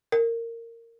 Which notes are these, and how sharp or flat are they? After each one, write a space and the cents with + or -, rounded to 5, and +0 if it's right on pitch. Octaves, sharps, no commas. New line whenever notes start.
A#4 -20